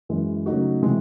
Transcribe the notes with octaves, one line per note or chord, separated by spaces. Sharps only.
F#2 E3 G#3
C#3 F#3 A3 D#4 F#4
C3 E3 G#3 C4